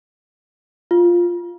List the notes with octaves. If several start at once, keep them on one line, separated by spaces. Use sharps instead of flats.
F4